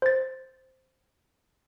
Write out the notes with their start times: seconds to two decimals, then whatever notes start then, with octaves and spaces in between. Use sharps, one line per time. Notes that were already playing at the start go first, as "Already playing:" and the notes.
0.02 C5 A6